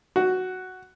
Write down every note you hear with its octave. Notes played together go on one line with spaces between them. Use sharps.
F#4